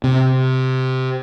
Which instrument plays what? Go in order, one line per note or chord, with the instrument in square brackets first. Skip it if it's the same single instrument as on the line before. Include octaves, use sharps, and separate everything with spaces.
[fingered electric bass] C3